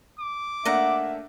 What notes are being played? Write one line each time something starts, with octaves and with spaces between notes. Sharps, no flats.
D6
A3 A#3 D4 E5 F#5 A#5